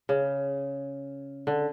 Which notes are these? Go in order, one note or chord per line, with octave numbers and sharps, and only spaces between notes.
C#3
D3